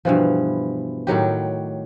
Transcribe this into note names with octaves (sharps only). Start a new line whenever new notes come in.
G2 B2 E3 F3
A2 D#3 F#3 G4